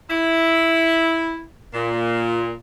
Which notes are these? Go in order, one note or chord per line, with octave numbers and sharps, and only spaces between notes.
E4
A#2